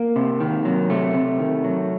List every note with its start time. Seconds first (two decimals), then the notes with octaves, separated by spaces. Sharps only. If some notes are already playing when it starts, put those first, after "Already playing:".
Already playing: A#3
0.16 C3
0.40 D#3
0.65 F#3
0.89 C3 A3
1.14 C3
1.39 D#3
1.64 F#3